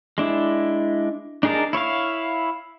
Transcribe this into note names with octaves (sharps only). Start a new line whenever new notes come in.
G#3 D4 E4
D4 D#4 G#4 A#4 A5
E4 C#5 E5 F5